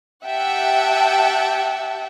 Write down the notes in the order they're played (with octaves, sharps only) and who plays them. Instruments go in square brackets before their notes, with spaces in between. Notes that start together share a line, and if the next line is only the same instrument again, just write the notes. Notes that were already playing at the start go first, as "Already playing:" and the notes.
[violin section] G4 E5 F#5 G5 A5